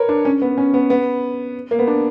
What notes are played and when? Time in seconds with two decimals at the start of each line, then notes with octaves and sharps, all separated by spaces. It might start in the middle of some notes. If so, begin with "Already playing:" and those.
Already playing: A#4 B4 C#5
0.09 D4
0.25 C#4
0.42 B3
0.58 C#4
0.74 B3
0.90 B3
1.71 A#3
1.79 B3
1.87 D4